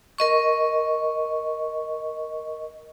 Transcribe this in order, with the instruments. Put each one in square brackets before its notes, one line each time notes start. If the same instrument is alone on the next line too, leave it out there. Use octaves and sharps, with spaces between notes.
[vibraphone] A#4 D#5 C#6